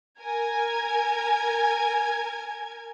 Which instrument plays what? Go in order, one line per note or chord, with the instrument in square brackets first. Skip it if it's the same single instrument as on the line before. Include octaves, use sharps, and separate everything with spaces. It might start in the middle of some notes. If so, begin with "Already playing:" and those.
[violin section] A#4 G#5 G#6